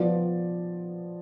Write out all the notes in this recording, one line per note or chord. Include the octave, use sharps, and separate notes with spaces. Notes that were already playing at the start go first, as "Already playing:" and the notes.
Already playing: F3 B3 F4 D5